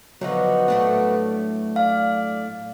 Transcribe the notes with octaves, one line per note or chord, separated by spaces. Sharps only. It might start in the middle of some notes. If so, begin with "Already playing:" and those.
D3 F3 F#3 B3 D#4 F#4
A2 A3 D4
D5 F5